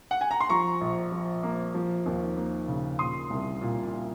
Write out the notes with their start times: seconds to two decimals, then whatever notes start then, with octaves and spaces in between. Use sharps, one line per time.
0.11 F#5
0.21 G#5
0.31 A#5
0.41 C6
0.49 F3 A#5 C#6
0.81 A#1
1.12 F3
1.43 A#3
1.74 F3
2.06 D#2
2.36 A#3
2.68 C#3
2.99 A#2 C6 D#6
3.30 C2
3.62 A#2
3.93 A#2